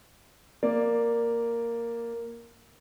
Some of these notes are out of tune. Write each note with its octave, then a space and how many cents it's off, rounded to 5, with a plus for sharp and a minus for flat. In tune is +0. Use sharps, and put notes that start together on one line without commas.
A#3 +0 D5 +0